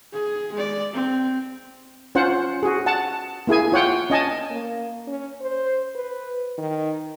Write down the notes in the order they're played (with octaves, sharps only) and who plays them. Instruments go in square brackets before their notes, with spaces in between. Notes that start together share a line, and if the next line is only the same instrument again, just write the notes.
[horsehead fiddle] G#4
G#3 D5
C4
[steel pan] C#4 F4 C5 F#5
F#4 G#4
F#5 A5
A#3 E4 G#4 G#5
F4 C#5 F#5 G5
C#4 D#5 G#5 A5
[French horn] A#3
C#4
C5
B4
D#3